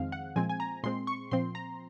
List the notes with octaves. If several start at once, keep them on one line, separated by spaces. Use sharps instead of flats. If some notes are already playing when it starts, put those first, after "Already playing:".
Already playing: F2 D#3 G#3 C4 F5
F#5
A#2 F3 G#3 C4 G#5
G#5
A#5
A#2 G#3 C4 C6
C#6
A#2 F3 C4 C6
A#5